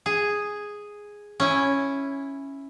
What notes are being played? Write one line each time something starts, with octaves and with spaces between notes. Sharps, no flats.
G#4
C#4 E4